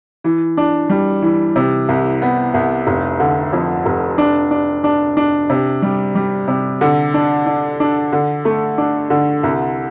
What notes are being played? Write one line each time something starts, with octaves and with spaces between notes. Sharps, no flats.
E3
D4
G3
E3
C3
C2
B3
C2
F1
D3
F2
F1
D4
D4
D4
D4
C3
G3
G3
C3
D3
D4
D4
D4
D3
A3
D4
D3
C2